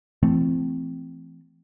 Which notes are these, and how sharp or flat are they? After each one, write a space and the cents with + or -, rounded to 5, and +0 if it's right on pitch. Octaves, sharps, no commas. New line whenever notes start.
E3 +35 A3 +0 C4 -15